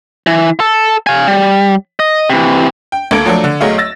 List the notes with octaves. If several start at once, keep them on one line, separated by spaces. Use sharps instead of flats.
E3
A4
F5 G#5
G3
D#5
C3 E3
G5
D2 A#3 A4 G#6 D7
F3 F#3 A3 D4 A4
D3
B1 F#3 A3 G#4 D#5 F5
E6 A6 A#6